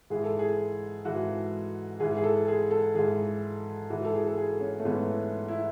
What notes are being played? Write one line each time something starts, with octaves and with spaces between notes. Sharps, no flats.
G#2 E3 G#4
A4
G#4
G#2 E3 F#4
G#2 E3 G#4
G#4
A4
G#4
A4
G#2 E3 G#4
G#2 E3 F#4
A4
G#4
A4
G#4
C#4
A3
G#2 E3 B3
E4